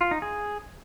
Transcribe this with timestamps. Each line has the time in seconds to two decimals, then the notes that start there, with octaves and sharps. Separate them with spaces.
0.01 F4
0.11 D#4
0.22 G#4